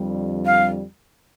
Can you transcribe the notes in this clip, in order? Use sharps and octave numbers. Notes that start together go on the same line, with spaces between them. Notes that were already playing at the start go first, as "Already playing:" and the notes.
Already playing: F2 D3 G3
F5